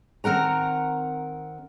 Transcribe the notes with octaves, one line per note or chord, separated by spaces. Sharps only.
D#3 C4 A#4 F#5 A#5